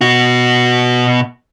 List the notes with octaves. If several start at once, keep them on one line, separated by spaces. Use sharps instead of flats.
B2 F#4